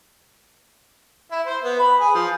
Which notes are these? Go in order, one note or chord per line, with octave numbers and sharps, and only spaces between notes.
E4
C5
B3
B5
G#4
F3